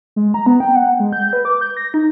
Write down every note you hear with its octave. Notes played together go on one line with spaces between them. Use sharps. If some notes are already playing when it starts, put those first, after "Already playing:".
G#3
A#5
B3
G5
F#5
G#3
G6
B4
D6
G6
A#6
D#4